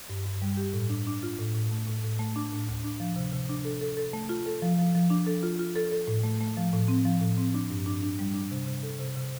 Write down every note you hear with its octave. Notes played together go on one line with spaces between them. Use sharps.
G2
G2
G3
G4
A2
D4
D4
F4
A2
A2
A3
A2
A2
A3
D4
A2
D2
D4
F3
C3
C3
D4
A4
A4
A4
A3
F4
A4
F3
F3
F3
D4
A4
F4
F4
A4
A4
A2
A3
A3
F3
A2
C4
F3
A2
C4
D4
G2
D4
D4
G3
D4
C3
C3
A4
C3
C3